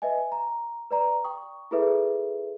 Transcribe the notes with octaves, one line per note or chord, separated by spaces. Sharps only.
B4 D#5 E5 G#5
A#5
B4 D5 A#5
G5 C#6 D#6
E4 F4 G#4 A4 B4 E5